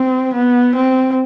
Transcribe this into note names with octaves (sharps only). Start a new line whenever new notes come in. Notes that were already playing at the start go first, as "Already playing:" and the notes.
Already playing: C4
B3
C4